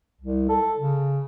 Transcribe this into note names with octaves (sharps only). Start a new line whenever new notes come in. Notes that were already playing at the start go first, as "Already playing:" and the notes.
C2
A4
C#3